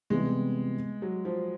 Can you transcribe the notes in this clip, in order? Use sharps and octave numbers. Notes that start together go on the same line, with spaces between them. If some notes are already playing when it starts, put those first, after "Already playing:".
C3 E3 G3 G#3 B3 E4
F#3
F3